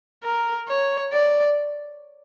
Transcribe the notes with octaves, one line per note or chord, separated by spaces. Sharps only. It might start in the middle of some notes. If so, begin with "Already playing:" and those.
A#4
C#5
D5